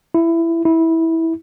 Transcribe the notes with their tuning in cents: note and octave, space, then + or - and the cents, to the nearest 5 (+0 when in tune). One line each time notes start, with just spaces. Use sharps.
E4 +15
E4 -15